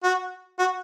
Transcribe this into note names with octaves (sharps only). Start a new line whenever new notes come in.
F#4
F#4